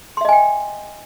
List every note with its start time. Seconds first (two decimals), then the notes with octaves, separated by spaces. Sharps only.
0.17 C6
0.21 E5
0.25 D#5
0.29 G#5
0.32 G5